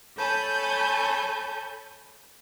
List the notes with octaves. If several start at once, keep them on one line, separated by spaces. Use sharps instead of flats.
A4 C#5 G#5 A5 B5 G6